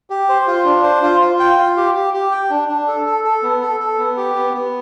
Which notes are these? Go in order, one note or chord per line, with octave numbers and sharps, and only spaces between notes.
G4
C5
F4
D4
C5
F4
F4
G5
F4
G4
G4
G4
G5
D4
D4
A4
A4
A4
B3
A4
A4
B3
G4
B3
B3